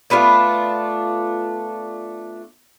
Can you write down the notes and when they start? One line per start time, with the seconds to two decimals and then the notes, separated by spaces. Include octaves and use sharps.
0.10 A3 B3 D4 F4